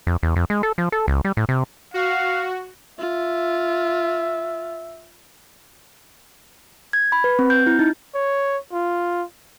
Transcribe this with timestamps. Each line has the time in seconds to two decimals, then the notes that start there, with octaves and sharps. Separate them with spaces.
0.07 F2
0.23 E2
0.36 F2
0.50 G#3
0.63 A4
0.78 F3
0.92 A4
1.08 C#2
1.25 G3
1.37 A2
1.49 C3
1.94 F#4 F5
2.99 F4 E5
6.93 G#6
7.12 B5
7.24 B4
7.39 C4
7.50 G6
7.67 E4
7.79 D#4
8.15 C#5
8.73 F4